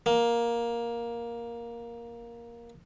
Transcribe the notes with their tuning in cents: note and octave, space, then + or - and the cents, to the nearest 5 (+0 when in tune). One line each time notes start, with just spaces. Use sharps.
A#3 +10